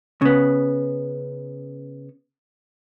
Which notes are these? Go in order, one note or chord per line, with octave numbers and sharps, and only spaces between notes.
C#3 B3